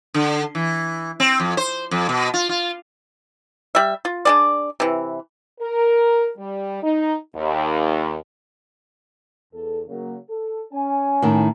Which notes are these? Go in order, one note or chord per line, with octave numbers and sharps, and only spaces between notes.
D3
E3
C4
F2
C5
F2
B2
F4
F4
G3 E5
F4
D4 G#4 D5
C3 E3
A#4
G3
D#4
D#2
E2 A4
C#3 F#3 A#3
A4
C#4 G#5
A2 D#3